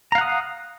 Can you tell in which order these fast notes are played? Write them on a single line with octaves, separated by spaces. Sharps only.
A#5 F5 F#5 D#6